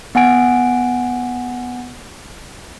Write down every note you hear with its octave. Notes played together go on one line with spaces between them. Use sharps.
B3 F#5 G#5 D7